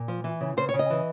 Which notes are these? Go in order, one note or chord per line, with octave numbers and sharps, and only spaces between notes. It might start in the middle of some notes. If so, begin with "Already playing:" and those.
Already playing: A#2
F3
E3
C#3
C#3 C5
C#5
C#3
D#5
E3